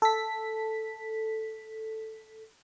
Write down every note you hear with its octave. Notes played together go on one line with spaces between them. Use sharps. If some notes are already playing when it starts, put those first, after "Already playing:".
A4 B6